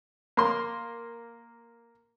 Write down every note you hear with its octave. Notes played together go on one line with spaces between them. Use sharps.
A#3 C6